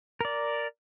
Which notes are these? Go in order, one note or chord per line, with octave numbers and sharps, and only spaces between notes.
A#4 D5